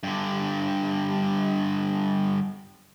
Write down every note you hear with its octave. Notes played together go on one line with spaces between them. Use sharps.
G2 D3